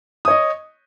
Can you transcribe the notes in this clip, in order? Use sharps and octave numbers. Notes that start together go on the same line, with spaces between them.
C#5 D#5 D#6